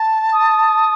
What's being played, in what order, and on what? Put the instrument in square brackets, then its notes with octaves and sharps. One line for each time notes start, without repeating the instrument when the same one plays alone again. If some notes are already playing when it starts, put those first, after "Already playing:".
Already playing: [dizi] A5
[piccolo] D#6